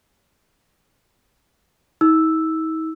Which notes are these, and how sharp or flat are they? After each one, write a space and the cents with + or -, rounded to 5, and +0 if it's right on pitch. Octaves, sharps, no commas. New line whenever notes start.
D#4 +45 E6 +0